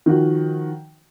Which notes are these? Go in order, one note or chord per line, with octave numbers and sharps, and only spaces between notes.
D#3 F3 F#4